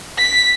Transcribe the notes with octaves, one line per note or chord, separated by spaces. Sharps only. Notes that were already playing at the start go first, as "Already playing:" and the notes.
B6